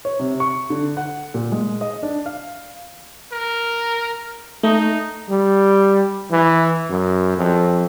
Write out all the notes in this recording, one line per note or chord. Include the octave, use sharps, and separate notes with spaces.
C#5
C3
C#6
D3
F#5
A#2
G#3
D#5
D4
F5
A#4
A3 D#4
G3
E3
F#2
F2